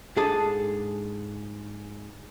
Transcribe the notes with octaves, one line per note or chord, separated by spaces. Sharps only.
G#2 D4 G#4 A4 A5